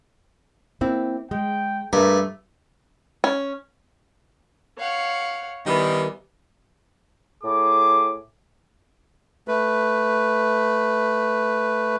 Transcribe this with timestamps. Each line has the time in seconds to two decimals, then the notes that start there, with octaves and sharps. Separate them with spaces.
0.81 A#3 C4 E4
1.31 G#3 G5
1.93 G2 A3 A#4
3.24 C#4
4.79 C#5 F5 F#5
5.66 D#3 E3 G3 B3
7.44 A2 G#4 D6
9.48 A3 B4